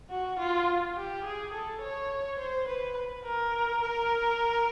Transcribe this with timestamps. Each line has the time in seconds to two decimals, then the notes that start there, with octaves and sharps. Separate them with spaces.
0.10 F#4
0.38 F4
0.96 G4
1.24 G#4
1.53 A4
1.82 C#5
2.39 C5
2.67 B4
3.24 A#4
3.82 A#4